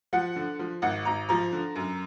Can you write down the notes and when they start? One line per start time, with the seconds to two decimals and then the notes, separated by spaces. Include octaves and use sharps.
0.13 F3 F#5
0.36 D3
0.59 F3
0.82 G#1 F#5
1.05 G#1 A#5
1.29 F3 A#5
1.52 D3
1.76 F#2